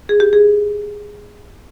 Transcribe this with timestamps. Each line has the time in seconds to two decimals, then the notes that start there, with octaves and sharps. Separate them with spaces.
0.09 G#4
0.20 G4
0.33 G#4